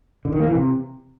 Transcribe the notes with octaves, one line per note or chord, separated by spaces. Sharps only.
D3
D#3
A#3
E3
C3